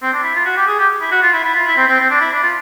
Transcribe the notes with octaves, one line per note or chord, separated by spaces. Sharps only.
C4
D4
E4
F4
F#4
G4
G#4
G4
E4
F#4
F4
E4
E4
F4
E4
C4
C4
C4
D4
E4
D4
F4